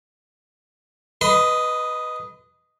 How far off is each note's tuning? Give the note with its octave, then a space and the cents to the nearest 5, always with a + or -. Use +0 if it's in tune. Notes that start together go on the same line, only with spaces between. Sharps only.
B4 +0 D#5 +0 B5 +45